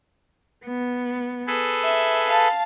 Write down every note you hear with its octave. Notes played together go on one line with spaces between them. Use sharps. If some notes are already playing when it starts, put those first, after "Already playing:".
B3
G#4 A4 B4
E5
F5 A5